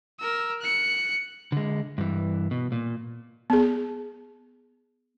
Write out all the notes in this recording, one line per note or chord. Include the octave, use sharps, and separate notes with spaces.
A#4 E6
F#6 C#7
D3 G#3
G2 E3
B2
A#2
B3 G#4